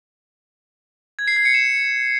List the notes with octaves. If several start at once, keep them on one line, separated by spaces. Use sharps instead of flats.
G#6
C7
G#6
C#7
E7